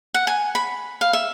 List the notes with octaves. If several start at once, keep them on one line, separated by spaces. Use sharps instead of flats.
F#5
G#5
B5
F5
E5